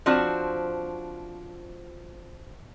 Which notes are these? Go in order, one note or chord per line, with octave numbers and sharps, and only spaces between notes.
F3 C4 D4 F#4